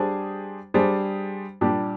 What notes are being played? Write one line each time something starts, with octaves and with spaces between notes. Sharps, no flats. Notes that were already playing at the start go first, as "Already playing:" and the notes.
Already playing: G3 D4 G#4 C5
G3 D4 G#4 C5
A#2 G3 D4 G4